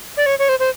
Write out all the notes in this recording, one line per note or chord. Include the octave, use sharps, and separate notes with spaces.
D5
C#5
C#5
C5
C5